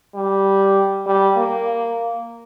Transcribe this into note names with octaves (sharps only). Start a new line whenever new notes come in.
G3
G3
A#3